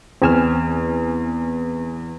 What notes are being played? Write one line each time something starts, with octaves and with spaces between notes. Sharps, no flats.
E2 C4 G#5 F6 E7